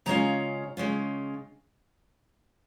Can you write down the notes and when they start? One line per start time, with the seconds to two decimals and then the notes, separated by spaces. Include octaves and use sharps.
0.06 C#3 G#3 C#4 F4 A#5
0.77 C#3 G#3 C#4 F4